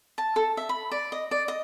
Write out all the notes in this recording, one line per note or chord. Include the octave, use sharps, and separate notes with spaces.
A5
A4
E5
B5
D5
D#5
D5
D#5